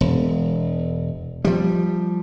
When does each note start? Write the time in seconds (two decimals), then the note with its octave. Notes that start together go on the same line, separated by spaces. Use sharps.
0.01 E1
1.45 F3 G3